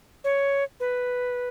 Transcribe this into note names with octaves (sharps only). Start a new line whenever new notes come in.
C#5
B4